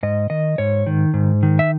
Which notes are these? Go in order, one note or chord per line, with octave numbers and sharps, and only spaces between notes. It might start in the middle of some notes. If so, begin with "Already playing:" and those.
G#2 D#5
D#3 D#5
G#2 C#5
D#3
G#2
D#3
E5